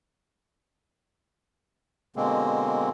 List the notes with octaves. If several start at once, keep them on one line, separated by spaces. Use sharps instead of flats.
B2 D3 G#3 A#3 C4